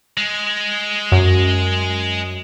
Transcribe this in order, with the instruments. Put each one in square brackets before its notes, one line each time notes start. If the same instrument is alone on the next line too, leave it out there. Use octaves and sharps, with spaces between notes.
[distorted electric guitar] G#3
[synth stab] F#2